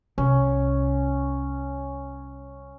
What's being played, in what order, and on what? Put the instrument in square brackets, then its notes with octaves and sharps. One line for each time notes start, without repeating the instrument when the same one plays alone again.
[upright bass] C2 [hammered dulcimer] C#4